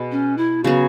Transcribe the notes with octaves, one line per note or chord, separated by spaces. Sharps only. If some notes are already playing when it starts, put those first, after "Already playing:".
Already playing: B2 B3 G#4
C#4
E4
C#3 F#3 B3 F#4 G#4